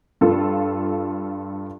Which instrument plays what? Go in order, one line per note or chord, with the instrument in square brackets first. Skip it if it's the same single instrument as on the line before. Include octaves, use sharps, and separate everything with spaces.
[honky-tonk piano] G2 F4 A4